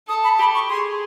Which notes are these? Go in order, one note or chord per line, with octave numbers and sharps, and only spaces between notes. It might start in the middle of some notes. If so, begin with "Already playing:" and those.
A4 D#6
B5
G4 B5
C#6
G#4 C6